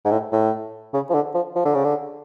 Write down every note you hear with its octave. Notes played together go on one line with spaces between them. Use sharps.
G#2
A2
A2
C#3
F3
D3
F3
F3
D3
C#3
D3